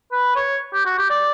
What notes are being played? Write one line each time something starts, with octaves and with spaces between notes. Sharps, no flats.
B4
C#5
G4
F#4
G4
D5